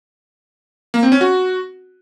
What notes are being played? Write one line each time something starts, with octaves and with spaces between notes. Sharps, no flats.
A#3
C4
C#4
F#4